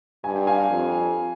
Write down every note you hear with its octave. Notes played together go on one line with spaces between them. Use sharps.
G2 G#5
G5
F5 G#5
F2